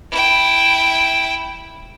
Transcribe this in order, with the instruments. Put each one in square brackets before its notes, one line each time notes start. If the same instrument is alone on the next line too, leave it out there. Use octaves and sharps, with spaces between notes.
[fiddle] E4 G5